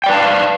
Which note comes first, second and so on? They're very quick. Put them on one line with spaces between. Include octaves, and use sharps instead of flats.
G5 D5 B4 A5 F5